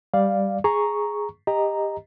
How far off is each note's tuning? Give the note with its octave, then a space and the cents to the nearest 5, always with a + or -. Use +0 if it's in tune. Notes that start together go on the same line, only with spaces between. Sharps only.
G3 +0 D5 +0 F5 +0
G#4 +0 A#5 +0 C#6 +0
G4 +20 D#5 +0 A#5 +0